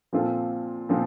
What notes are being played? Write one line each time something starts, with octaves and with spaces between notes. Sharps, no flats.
A#2 F3 C4 F4 A4
A#2 F3 C4